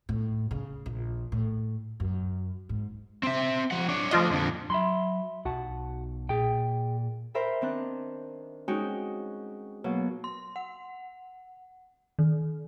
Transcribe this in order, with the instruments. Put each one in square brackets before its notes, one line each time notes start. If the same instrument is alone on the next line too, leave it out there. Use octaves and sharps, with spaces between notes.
[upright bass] A2
C#3
A#1
A2
F#2
G#2
[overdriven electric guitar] C4 E5
F3 F#5
D4 C#5
[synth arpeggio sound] F3 F4 D#5 [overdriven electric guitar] A3 D4
[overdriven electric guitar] F2 D3
[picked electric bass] F#3 [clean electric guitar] E5 B5 C6
[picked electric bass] B1 [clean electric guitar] F#4 F#5 A5
[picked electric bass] A#2 [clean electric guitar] G#4 G5
[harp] A#4 C5 E5 G5 B5
D#3 C4 D4 F#6
G#3 C#4 D#4 F#4 G5
B2 F#3 A#3
[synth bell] C6
F#5
D#3